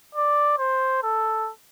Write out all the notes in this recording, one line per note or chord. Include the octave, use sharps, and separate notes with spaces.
D5
C5
A4